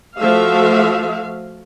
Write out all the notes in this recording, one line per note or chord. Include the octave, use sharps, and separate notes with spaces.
F3 A3 F#4 E5 F5